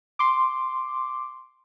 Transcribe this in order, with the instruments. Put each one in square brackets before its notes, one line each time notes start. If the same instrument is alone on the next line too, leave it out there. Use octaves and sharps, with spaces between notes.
[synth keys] C6 D6